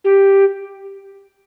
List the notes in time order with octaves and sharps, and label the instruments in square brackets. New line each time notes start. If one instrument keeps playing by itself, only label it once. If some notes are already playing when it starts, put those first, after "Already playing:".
[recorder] G4